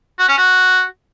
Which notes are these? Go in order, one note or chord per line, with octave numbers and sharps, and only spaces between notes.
F#4
C#4
F#4